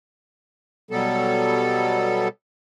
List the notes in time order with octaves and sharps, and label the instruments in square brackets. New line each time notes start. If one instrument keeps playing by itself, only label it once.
[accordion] B2 F#3 G3 B3 A4